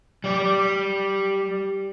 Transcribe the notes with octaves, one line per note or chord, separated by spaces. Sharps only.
G3 D5